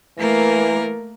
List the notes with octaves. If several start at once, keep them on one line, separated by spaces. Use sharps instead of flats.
E3 A3 A#3 A#4